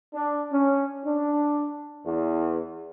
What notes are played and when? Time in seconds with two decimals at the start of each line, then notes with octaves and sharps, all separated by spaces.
0.14 D4
0.53 C#4
1.06 D4
2.06 E2